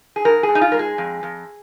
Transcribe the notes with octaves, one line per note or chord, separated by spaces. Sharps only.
G#4
G#2 A#4
G#4
G#2
D#4
F4
G#3 A#4
G#4
F2
F2